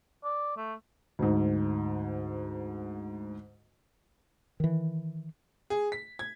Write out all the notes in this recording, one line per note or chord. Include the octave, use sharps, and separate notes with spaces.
D5
A3
D2 G#2
D#3 E3
G#4
B6
G#6